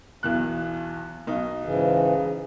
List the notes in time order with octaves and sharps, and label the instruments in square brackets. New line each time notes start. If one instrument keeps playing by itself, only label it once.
[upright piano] B1 E2 F#6
B1 D#4
[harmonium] G#2 C#3 E3